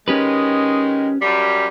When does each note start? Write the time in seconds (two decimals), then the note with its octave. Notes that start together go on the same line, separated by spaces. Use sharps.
0.08 D#3 G#3 C#4 G4 B4
1.22 F#2 G3